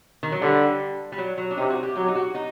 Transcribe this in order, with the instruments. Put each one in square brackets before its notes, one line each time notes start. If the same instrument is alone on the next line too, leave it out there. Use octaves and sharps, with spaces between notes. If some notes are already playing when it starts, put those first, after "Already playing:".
[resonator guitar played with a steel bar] D#3
F#3
[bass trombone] D3 [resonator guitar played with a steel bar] G3
[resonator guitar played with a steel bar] G3
F#3
F#3
D4
[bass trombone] C3 [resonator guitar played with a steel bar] D#4
[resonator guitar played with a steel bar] F#4
G4
[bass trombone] F#3 [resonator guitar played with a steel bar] G4
[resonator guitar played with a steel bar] D#4
F#4
D#4